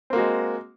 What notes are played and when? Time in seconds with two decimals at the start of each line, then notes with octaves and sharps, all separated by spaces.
0.10 C4
0.13 A#3
0.16 F#4
0.18 G#3